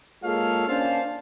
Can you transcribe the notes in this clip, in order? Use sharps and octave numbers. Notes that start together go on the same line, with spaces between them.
G#3 A#3 F4 A4 C#5 F5
A#3 C#4 D4 C5 F5 A5